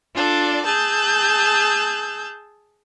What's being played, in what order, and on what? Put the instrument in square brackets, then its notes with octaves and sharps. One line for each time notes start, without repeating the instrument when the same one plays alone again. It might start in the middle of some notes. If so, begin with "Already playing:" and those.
[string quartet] D4 F4 A4 D5
G#4 A5 E6 G6